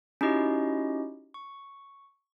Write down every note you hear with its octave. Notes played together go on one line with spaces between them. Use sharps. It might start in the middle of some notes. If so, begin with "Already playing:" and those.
C#4 D#4 E4 F#4 G4 D#5
C#6